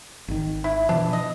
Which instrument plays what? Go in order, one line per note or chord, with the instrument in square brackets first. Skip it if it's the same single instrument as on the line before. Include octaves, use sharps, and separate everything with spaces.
[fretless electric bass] G#1 D#3
[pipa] E4
[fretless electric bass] B2 E3 F3 [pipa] D4
[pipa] D#5